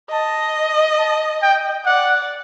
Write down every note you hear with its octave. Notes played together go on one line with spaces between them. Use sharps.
D#5 A5
A5
G5
D5 F#5